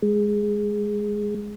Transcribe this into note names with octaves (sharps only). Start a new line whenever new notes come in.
G#3